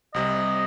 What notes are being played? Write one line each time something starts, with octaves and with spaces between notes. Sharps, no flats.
C2 C3 G3 D#5